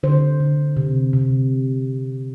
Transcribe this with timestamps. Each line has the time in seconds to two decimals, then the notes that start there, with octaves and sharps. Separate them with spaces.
0.03 D3 C5
0.40 D3
0.77 C3
1.13 C3